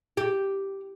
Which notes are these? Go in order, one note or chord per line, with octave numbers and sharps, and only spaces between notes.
G4